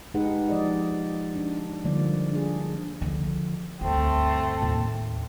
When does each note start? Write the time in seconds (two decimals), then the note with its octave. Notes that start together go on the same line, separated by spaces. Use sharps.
0.14 G#3 D#4 G4 G#4 B4 F#5
0.49 F3 D5 D#5
1.36 D4
1.85 D3 F3 G3 A#3 D5
2.32 D4 G#4
3.01 D3 F3
3.81 D2 G2 A3 C4
4.62 D#2 A2